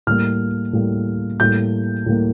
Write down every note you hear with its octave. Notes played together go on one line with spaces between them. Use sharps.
A2 G3 A#3 F6
A2 G3 A#3
A2 G3 A#3 G6
A2 G3 A#3